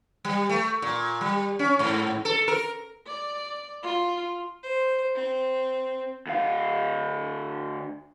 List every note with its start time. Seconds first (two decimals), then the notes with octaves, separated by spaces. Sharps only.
0.25 G3
0.49 A3
0.82 A#2
1.21 G3
1.59 C#4
1.79 G#2
2.25 A4
2.48 A#4
3.07 D5
3.83 F4
4.63 C5
5.15 C4
6.27 D2 F5